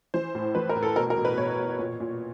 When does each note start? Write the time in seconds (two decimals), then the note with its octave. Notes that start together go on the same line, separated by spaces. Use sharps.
0.14 E3 C5
0.35 A2
0.55 E3 B4
0.69 A#4
0.76 A2
0.83 A4
0.96 B2 A#4
1.10 A#4
1.17 B2
1.25 B4
1.38 B2 C#5
1.58 B2
1.79 A#2
2.00 A#2